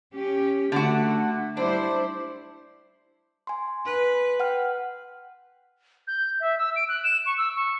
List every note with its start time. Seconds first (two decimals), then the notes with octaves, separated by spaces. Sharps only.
0.13 C#4 G4
0.72 D3 A3 F#4
1.57 G3 D4 E4 C5
3.47 G#5 C6
3.86 B4
4.40 F#5 G5 F6
6.07 G6
6.40 E5
6.58 E6
6.76 D7
6.88 F#6
7.04 E7
7.26 C#6
7.38 E6
7.56 C#6